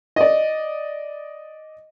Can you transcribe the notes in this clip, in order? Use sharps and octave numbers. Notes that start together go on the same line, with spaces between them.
D5 D#5